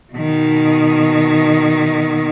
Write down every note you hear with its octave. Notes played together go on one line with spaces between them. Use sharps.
B2 D#3